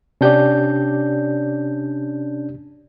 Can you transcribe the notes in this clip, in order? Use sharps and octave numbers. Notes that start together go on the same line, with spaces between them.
C3 C#4 D4 G4 D5 G6